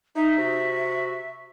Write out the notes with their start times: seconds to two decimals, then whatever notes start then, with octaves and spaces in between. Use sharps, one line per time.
0.16 D#4 E5
0.38 C3 F#4